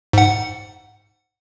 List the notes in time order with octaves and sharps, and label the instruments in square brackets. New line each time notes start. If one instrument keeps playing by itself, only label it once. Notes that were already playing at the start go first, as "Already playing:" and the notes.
[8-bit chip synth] G#2 F#5